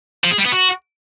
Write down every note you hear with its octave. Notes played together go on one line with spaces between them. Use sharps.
F3
G#4
G3
B3
F#4